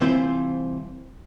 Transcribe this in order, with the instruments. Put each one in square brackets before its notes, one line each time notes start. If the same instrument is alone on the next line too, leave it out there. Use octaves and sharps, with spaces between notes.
[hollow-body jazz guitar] C2 E3 C4 E4 F4 C5